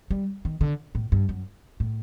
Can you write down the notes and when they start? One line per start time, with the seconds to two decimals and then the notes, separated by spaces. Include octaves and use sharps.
0.10 G3
0.45 D#3
0.61 D3
0.95 A2
1.12 G2
1.29 F#2
1.80 A2